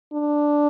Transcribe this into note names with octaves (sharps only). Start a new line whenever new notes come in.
D4